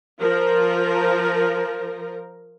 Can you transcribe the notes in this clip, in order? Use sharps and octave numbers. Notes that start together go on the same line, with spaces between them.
F3 A#4